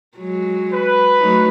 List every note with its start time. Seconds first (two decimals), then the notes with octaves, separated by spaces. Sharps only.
0.18 F#3 G#3
0.73 B4
1.18 F#3 A3 D#4